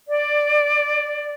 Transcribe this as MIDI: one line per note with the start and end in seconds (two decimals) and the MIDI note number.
0.07 1.33 74